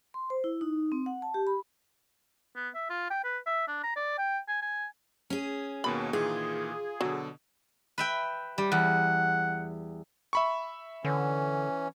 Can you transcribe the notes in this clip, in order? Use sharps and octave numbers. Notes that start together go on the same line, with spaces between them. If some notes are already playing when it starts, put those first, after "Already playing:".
C6
C5
E4
D#4
C4
F#5
A5
G4
B5
B3
E5
F4
G5
B4
E5
D4
A#5
D5
G5
G#5
G#5
C#4 G#4
D#2 B2 A#3 B5
A#2 D#3 E3 F4 G#4
B2 D3 F#3
B4 E5 G5
G3 G4
E2 F#5
E5 B5 C#6
D3 E3 C#4